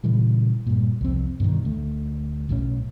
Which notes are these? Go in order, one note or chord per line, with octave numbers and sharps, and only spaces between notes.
A#2 C#3 E3 G3
G2 A#2
C2 F2 C4
G2 B2 D3 D#3
D2 A3
B1 A2 F#3 C#4